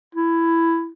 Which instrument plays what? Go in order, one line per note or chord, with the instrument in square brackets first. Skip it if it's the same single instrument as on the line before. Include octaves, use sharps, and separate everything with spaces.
[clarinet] E4